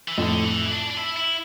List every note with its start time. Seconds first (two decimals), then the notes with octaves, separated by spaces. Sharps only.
0.08 E3
0.17 F2 A2 D3
0.44 E3
0.66 E4
0.71 D4
0.90 D4
0.97 E4
1.17 E4